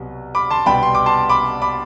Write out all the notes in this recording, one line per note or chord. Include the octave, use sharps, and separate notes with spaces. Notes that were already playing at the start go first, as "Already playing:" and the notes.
Already playing: C2 B2 F#3 B3
B5 D6
A5 C6
C2 B2 G3 B3 G5 B5
C6
D6
A5 C6
B5 D6
B5 D6